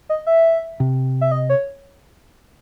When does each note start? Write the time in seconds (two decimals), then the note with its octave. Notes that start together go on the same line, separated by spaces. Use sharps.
0.09 D#5
0.27 E5
0.80 C3
1.21 E5
1.31 D#5
1.50 C#5